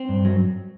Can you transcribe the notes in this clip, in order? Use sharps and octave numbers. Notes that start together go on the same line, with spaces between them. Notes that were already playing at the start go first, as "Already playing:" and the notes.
Already playing: C4
G2
F#3